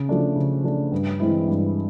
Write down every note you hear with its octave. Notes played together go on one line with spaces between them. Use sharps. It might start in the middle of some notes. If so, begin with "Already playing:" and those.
Already playing: C#3
F3 A3 D4
C#3
F3 A3 D4
G2
E3 G#3 C4 E4
G2